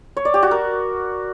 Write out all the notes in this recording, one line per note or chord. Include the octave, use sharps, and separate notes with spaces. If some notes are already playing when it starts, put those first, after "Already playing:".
C#5
D5
G4
F#4
A#4